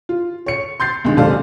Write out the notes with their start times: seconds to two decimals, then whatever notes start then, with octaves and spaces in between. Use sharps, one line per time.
0.09 F4
0.46 C#5 C#7
0.80 C6 G6 A6 C7
1.04 C2 G2 D#3 G#3
1.17 F#1 D#2 C3 A4 D5 F5